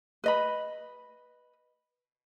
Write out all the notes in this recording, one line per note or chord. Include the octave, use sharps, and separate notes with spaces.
B4 D#5 B5